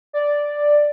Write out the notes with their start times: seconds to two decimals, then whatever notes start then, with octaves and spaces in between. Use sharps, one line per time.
0.13 D5